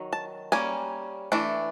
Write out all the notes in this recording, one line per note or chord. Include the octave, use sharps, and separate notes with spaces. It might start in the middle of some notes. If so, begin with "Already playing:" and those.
Already playing: D#3 F#3
A5
G3 A#3 C#4 G#5
E3 A3 D4